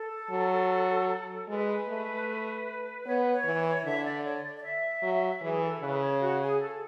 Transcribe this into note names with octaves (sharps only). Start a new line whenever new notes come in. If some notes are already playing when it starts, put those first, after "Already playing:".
Already playing: A4
F#3
G#3 B4
A3
B3 C#5
B4
C#5
E3
D3 E5
D5
C#5
D5
D5
E5
F#3
E3 G#4
A4
C#3 B4
C#5
F#4
G#4
A4